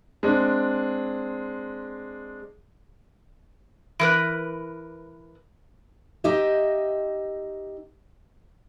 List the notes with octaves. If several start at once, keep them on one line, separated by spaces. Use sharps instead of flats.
G#3 C4 D4
E3 A#4 B4
D#4 G4 D#5 E5